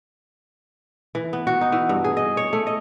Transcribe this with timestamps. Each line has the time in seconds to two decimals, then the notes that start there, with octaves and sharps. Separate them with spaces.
1.15 E3
1.33 B3
1.47 F#4
1.61 D#4
1.72 E3
1.89 G2
2.04 G#4
2.17 D#5
2.37 C#5
2.53 A3
2.67 D#5